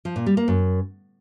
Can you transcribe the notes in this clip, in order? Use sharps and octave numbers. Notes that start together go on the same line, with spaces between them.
F3
A#2
G3
A#3
F#2